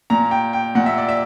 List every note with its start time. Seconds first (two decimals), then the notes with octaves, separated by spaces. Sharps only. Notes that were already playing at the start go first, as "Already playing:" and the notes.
0.10 A#2 A#5
0.31 G5
0.53 G5
0.75 A#2 F#5
0.86 E5
0.98 D5
1.09 E5